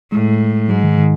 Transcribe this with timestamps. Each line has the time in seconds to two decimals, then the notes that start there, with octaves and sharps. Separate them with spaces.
0.12 A2 G#3
0.69 G#2 F#3
0.83 D#3
0.98 D#3